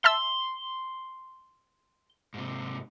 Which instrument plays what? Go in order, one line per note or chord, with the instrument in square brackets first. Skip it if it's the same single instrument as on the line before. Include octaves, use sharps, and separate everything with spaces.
[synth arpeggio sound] E5 A5 E6 [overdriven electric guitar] C6
[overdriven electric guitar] G#2 C3